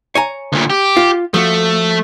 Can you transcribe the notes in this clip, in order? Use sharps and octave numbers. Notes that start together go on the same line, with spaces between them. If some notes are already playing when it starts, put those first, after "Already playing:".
C#5 G#5 A#5
D2 A#2
G4
F4
F3 A3 F#4